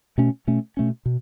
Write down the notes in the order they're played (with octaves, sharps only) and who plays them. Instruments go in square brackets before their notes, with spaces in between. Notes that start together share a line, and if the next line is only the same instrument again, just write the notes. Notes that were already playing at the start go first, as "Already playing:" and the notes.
[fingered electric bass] B2 A3 C#4
B2 A3 C#4
B2 A3 C#4
B2